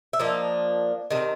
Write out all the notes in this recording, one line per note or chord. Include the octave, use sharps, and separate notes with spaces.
E5
F3 A#3 D4 D#5
C3 D#3